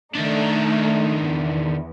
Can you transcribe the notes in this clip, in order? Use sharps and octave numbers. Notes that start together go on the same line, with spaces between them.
D#3 A3 D4 D#4
E2